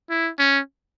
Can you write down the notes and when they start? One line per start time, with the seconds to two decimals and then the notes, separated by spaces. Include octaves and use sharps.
0.10 E4
0.39 C#4